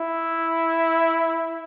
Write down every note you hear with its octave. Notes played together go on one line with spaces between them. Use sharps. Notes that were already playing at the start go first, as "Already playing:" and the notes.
Already playing: E4